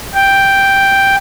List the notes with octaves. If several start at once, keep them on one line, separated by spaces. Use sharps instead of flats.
G5